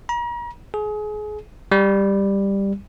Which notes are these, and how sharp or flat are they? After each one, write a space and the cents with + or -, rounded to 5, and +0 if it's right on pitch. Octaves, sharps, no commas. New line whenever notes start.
A#5 +40
G#4 +30
G3 +10